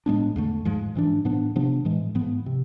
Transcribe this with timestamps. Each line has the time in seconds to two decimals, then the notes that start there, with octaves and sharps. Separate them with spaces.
0.06 A2 G#3 B3 D4
0.36 E2 D3 A3
0.65 G#2 F3 G#3
0.95 G#2 E3 B3 D4
1.25 A2 F3 B3 D4
1.56 C3 F3 B3 D4
1.85 A2 E3 G#3
2.15 G#2 F3 B3
2.46 C3